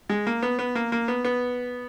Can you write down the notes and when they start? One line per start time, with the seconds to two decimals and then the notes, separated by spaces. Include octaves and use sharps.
0.09 G#3
0.27 A#3
0.43 B3
0.59 B3
0.75 A#3
0.92 A#3
1.08 B3
1.25 B3